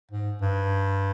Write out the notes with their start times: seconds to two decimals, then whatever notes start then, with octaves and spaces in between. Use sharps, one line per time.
0.11 G#2
0.41 G2